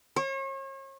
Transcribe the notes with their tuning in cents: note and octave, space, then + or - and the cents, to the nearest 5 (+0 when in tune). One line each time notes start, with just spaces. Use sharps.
C#5 -40